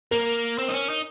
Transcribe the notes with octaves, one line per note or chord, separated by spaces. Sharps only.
A#3 A#4
C4
D#4
C#4
D#4